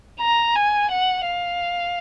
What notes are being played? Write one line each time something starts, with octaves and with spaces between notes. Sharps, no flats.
A#5
G#5
F#5
F5